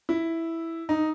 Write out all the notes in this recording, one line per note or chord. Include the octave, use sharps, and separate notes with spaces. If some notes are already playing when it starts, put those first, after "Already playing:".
E4
D#4